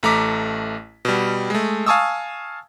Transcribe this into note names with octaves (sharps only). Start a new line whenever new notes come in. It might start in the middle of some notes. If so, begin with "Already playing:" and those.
A1 A3 A#5 D6 B6
B2 G3
G#3 A3
F5 G#5 A5 C#6 D#6 E6